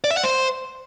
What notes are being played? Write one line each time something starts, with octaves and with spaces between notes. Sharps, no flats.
D5
E5
F#5
C5